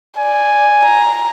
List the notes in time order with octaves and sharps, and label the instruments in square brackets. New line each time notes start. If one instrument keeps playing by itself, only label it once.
[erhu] D5 [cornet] G#5
[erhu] A#5